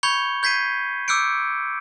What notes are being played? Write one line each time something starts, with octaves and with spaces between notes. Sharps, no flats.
B5 C#6 G6 G#6 C#7 G7
G6 G#6 B6 C7 D#7
D6 E6 F#6 G6 C#7 D7